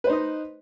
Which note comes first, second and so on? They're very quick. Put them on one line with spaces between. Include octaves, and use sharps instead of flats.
B4 C5 D#4 D#5